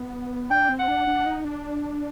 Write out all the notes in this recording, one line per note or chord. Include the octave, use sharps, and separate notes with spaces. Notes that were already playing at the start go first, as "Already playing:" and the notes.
Already playing: B3
D4 G5
C4
F#5
D4
D4
D#4
D4